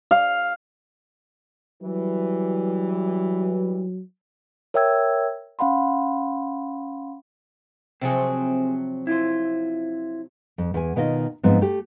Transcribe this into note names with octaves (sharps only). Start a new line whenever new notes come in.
F5
E3 F#3 G3
A#4 C#5 E5 G5 E6 G#6
C#4 F5 F#5 B5 C6
C3 F3 F#3 C4 G#4
E4 F4 C5
F2
E2 G#5
B2 D#3 F4 D#5
G#2 F3 B3 C4
A3 G4